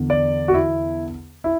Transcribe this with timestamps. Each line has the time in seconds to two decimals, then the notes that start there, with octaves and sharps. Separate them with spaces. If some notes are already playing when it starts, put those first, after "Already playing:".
Already playing: E2 D3
0.10 D5
0.48 F#4
0.54 E4
1.44 E4